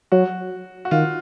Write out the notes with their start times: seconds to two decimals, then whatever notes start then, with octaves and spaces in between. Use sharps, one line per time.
0.12 F#3 F#4
0.85 F#4
0.91 D#3 F4